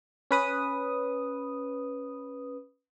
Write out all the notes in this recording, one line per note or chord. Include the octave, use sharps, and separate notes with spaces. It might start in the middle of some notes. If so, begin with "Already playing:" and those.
C#4 B4 D#6